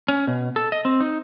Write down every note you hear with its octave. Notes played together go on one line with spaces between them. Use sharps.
C#4
B2
A4
D#5
C4
D#4